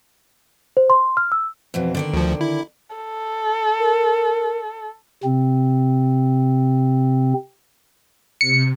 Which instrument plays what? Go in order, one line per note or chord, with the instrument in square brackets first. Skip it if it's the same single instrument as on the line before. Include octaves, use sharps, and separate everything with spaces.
[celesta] C5
C6
F6
E6
[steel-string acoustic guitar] F2 B2 E3
D3 D#3 D5
[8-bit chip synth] D2 F3
E4
[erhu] A4
[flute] A#4
[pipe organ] C3 C4
[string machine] C3 [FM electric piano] C#7